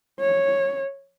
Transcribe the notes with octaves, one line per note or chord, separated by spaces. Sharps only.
C#5